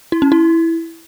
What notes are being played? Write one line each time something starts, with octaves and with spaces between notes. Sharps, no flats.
E4
C#4
E4